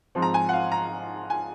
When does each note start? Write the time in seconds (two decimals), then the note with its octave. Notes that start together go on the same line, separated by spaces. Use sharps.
0.15 G#2 F3 C4
0.22 A#5
0.34 G#5
0.49 F#5
0.53 F5
0.72 A#5
1.30 G#5